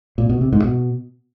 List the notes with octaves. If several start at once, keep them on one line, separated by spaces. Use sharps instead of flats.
A#2
B2
C3
G#2
B2